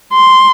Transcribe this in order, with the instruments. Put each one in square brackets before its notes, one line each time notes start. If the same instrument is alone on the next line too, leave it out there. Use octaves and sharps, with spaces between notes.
[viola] C6